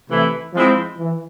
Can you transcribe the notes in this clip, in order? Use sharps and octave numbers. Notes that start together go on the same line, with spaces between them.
C3 E3 A3 E4
F3 G#3 C4 E4
E3